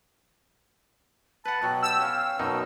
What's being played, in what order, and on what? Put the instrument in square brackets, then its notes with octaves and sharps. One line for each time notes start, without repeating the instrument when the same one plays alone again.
[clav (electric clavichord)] B4 F#5 [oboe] A5 [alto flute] B5
[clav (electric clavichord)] B2 F#3 [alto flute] G5
[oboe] G4 [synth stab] E6
[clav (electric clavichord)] C#4 [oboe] F5
[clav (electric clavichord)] F#2 B2 D#4 [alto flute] A5